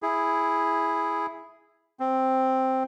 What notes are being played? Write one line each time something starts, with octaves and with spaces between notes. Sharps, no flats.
E4 G#4
C4